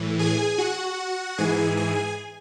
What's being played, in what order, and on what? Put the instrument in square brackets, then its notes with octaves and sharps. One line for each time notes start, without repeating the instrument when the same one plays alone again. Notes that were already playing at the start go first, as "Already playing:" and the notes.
Already playing: [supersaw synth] A2 E3
G#4 G#5
F#4 F#5
G#2 E3 G#4 G#5
G#4 G#5